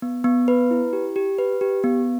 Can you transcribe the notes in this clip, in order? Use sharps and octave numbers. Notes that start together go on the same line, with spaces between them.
B3
B3
B4
E4
G4
G4
B4
G4
B3